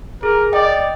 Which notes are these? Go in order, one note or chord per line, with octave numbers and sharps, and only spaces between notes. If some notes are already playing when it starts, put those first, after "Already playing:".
G#4 A#4
D5 D#5 G5